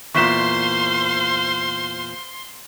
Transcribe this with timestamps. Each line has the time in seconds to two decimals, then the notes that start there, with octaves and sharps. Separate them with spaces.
0.15 E2 A#2 C5 F5 C6 C#6 B6 E7